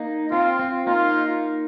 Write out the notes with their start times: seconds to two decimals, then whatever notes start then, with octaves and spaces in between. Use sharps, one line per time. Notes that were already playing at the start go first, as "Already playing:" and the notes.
Already playing: A#3 D#4
0.31 C4 F4
0.59 C4
0.86 A#3 D#4 F4